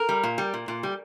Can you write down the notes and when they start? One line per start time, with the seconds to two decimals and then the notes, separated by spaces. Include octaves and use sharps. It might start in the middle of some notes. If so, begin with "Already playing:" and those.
Already playing: A#4
0.09 G3
0.24 A#2
0.38 G3
0.54 A#2
0.68 A#2
0.83 G3